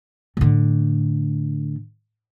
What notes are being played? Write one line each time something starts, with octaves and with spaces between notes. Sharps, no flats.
A2 D3